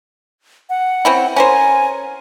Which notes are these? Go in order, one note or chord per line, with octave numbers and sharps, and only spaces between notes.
F#5
C4 C#4 E4
C#4 A#4 C5 G#5